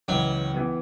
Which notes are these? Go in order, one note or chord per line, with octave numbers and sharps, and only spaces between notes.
C#2 C#3 E3 F#3
E3 B3